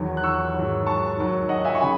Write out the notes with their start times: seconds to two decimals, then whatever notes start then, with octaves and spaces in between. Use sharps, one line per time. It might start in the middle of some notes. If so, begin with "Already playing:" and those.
Already playing: E2 D#3 F#3
0.17 F#6
0.23 C#6 E6
0.55 G#2 D#3 F#3
0.86 A5 C#6
1.18 D#2 D#3 F#3
1.49 D#5 F#5
1.65 E5 G#5
1.75 C#6
1.81 C#3 G#5 B5